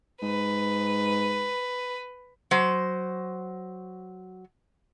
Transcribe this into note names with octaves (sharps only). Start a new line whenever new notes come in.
G#2 B4
F#3 C5